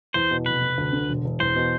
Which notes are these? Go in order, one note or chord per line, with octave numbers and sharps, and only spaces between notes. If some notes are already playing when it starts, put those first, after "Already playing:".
E2 C5
B2
F1 B4
F1
D2
D3
E1
E1
E2 C5
B2